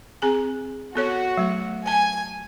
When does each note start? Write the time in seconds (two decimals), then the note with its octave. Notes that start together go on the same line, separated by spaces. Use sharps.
0.22 C4 G#4 G#5
0.95 B3 F#4 A4 C#5
1.37 F#3 A3
1.87 G#5 A5